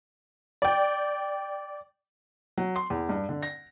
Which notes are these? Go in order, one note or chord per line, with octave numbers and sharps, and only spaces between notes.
D5 G5
F#3
C6
E2
G2
D3
A#6